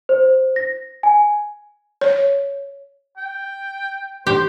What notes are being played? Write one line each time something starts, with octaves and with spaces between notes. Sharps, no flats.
C5
A#6
G#5
C#5
G5
G4 C5